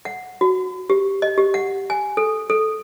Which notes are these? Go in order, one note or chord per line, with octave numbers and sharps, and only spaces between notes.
F#5
F#4
G4
D#5
G4
F#5
G#5
A4
A4